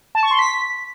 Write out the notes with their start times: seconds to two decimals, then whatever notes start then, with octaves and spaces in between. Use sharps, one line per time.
0.15 A5
0.23 C#6
0.31 C6
0.39 B6